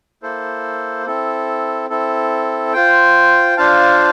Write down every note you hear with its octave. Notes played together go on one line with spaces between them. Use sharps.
A#3 E4 A4 C5
C4 E4 A4
C4 E4 A4
F4 C5 G5
D4 F4 C5 F5 A5